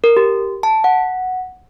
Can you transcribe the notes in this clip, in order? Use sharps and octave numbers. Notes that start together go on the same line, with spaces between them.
A#4
G4
A5
F#5